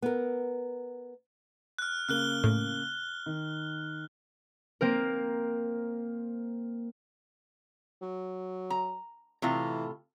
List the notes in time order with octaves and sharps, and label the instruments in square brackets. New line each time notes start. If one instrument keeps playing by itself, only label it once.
[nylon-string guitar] B3 A#4
[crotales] F6 F#6
[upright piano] C#3 A#3 [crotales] F6 F#6 G7
[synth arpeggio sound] A2
[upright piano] D#3
[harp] A#3 C4 A#4
[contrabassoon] F#3
[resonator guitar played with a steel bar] A#5
[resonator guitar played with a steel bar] A2 C3 F4 [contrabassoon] E3